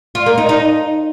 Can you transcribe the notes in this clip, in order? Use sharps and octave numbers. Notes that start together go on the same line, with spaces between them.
F4
A#3
D#4
D#4